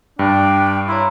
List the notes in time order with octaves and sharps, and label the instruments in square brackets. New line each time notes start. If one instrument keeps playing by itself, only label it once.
[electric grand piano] G2 [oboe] D4 [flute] G5
[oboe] E4 [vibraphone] C#5 A#5 C6